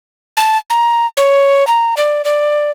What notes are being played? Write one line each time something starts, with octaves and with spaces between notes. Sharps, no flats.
A5
A#5
C#5
A#5
D5
D5